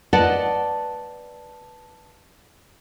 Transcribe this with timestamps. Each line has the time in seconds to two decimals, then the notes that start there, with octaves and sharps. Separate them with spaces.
0.13 B4 D5 D#5 F#5 A5